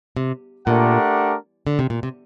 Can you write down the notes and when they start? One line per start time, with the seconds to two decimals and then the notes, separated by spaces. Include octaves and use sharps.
0.17 C3
0.66 A#2 A3 D4 G4 A#4 F#5
1.67 D3
1.79 C3
1.90 A#2
2.03 C3